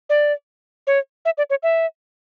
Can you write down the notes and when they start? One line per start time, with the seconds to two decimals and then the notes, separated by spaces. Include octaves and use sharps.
0.10 D5
0.87 C#5
1.25 E5
1.38 D5
1.50 C#5
1.63 E5